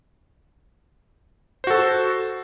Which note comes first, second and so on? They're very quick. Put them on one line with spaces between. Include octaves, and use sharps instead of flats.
C5 F#4 A4